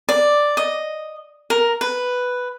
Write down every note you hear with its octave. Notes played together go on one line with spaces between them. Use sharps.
D5
D#5
A#4
B4